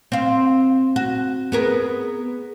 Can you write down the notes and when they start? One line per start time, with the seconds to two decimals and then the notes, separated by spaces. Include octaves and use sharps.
0.12 C4 F5
0.96 F#4
1.52 B3 G#4 A#4